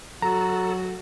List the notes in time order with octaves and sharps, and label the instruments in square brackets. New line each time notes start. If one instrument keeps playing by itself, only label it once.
[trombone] F#3 [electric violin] F#4 [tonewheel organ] A4 [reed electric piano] A#5